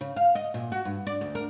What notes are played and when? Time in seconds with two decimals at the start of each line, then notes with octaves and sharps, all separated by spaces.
0.01 C#3
0.16 F5
0.35 D#5
0.54 A#2
0.72 F#4
0.85 G2
1.07 D5
1.21 D2
1.35 A#4